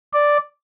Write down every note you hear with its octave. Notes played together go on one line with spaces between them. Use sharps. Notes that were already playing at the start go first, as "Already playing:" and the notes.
D5